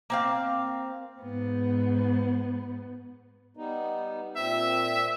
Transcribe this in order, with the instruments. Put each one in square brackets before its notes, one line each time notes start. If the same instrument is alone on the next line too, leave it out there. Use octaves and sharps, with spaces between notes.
[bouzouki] A#3 C4 F5
[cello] G#2 B3
[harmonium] G3 B3 D#4
[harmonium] A#2 C4 [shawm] E5